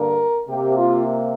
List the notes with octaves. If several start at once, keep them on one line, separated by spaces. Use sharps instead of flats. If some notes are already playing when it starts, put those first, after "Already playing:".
Already playing: G2 D3 A#3 A#4
C3 A#3 G4
F4